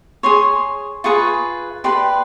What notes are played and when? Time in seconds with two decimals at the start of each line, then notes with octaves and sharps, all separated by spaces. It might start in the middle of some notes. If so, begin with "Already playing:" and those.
0.23 G#4 C#5 C6
1.04 F4 G#4 B4 C#6
1.84 G4 B4 D5 C6